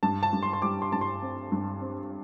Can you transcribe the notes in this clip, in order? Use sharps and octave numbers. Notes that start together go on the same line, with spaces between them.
G2 A5
A5
G2
C6
C6
G3 D6
C6
G2 A5
C6
C4
G2
C4